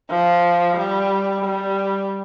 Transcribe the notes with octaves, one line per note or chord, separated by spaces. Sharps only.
F3
G3
G3